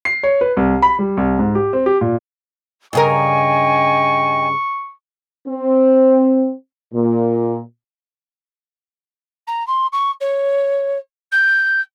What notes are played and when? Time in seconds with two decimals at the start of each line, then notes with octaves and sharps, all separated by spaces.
0.05 C7
0.23 C#5
0.41 B4
0.57 C2
0.82 B5
0.99 G3
1.17 C2
1.39 G#2
1.55 G4
1.73 C4
1.86 G4
2.01 A#2
2.93 G2 C#3 A#4 D#5 G5 G#5 C#6
5.47 C4
6.93 A#2
9.47 A#5
9.67 C6
9.92 C#6
10.20 C#5
11.32 G6